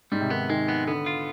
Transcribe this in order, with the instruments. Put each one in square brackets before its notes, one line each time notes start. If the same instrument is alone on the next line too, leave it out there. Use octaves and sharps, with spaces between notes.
[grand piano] G#2 [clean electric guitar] G3
[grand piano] C3
[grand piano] D#3 [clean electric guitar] B3
[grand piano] D#3 [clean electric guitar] G#3
[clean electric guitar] B3
[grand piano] D3 [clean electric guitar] B3
[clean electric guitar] F4